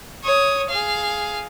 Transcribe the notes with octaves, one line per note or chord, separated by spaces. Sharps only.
C#5 D#6
G#4 F5